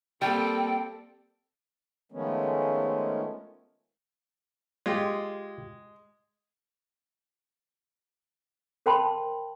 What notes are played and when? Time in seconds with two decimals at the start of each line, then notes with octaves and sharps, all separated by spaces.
0.22 G3 A#3 C4 A4 G5
2.12 D#3 F3 G#3 A3 B3 C#4
4.86 G#3 F4 G4
8.86 A#4 C5 G5 A5 B5 C6